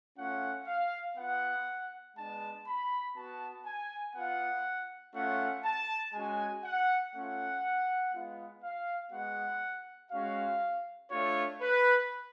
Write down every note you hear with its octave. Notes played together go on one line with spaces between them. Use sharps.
A3 C#4 F4 F#5
F5
B3 F4 F#5
G#3 B3 D4 A5
B5
B3 F#4 A5
G#5
B3 F4 F#5
A3 C#4 F4 F#5
A5
G#3 C#4 F#4 G#5
F#5
A3 C#4 F4 F#5
G#3 B3 F4
F5
G#3 B3 F#4 F#5
G#3 C#4 F#4 F5
A3 D4 F4 C#5
B4